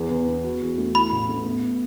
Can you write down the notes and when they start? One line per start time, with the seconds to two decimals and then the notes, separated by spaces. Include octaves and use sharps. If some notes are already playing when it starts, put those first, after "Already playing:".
Already playing: E2
0.10 E2
0.28 B3
0.44 F#4
0.61 E2
0.78 A3
0.95 E4 B5
1.12 A1
1.29 A3
1.45 B3